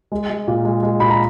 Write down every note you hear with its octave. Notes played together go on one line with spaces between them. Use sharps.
G#3
G#3
A#2
G#3
G#3
A#2 B5
A#5